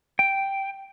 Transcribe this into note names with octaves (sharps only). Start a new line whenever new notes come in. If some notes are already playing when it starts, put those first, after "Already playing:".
G5